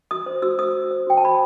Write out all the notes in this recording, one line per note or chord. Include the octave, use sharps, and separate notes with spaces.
F#4 D#6
C5
F#4 E6
C5 D#6
F#4
C5
F#4 G5
A5
C5 B5